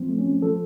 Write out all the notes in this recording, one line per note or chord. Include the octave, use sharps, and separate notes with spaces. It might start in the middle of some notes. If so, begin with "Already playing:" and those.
Already playing: F3 C4
A3
C#4
F3
F3 A4